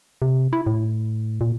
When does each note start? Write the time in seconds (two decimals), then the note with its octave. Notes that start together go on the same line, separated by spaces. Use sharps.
0.22 C3
0.53 E4
0.67 A2
1.41 A#2